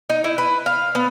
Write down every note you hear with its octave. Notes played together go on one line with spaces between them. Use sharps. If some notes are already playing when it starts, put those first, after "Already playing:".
D#4
E4
B4
F5
B3